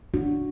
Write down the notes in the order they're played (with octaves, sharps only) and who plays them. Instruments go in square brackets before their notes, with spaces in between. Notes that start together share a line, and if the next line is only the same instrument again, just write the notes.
[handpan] D4 F#4